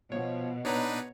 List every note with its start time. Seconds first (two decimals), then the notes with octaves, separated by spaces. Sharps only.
0.12 B2 F3 C#5
0.65 B3 D4 D#4 B4 C#5 A#5